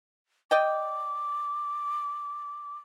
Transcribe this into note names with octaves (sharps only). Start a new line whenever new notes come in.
D5 D#5 G5 D6